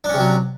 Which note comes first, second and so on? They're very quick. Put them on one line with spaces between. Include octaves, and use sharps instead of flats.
D4 C#4 C3 F#3